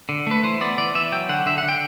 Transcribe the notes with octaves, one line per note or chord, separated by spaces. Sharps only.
D3
A3 B4
E3 C5
B3 D5
E3 D5
E3 E5
F#3 G5
D3 F#5
D3 E5
D3 F#5
G5